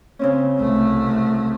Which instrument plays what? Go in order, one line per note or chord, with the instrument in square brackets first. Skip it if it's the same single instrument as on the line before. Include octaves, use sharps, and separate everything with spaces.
[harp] C#3 C4 C#4
[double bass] C2 A3